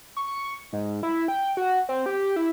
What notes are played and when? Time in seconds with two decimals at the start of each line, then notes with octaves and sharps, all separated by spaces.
0.17 C#6
0.73 G#2
1.03 E4
1.28 G5
1.57 F#4
1.89 C4
2.06 G4
2.36 E4